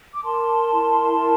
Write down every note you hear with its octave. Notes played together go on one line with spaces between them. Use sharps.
D6
A#4 A5 C6
E4
A#4